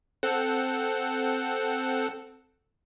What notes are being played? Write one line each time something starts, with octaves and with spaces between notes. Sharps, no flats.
C4 A4 F#5